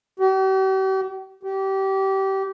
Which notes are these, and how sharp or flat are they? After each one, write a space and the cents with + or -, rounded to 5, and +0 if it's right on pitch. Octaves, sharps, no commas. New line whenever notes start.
G4 -45
G4 -25